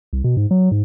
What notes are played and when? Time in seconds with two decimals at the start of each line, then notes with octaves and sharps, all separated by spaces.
0.13 C2
0.24 B2
0.37 G#2
0.51 F#3
0.71 G#2